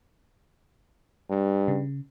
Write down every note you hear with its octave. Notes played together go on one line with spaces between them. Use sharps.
G2
C#3